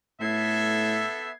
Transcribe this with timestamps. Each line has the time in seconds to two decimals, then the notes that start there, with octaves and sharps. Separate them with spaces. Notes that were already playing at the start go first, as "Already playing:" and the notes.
0.21 A2 B3 A4 E5 G#6 C7